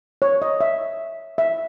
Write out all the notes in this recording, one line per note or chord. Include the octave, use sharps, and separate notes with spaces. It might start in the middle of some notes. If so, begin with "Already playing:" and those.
C#5
D#5
E5
E5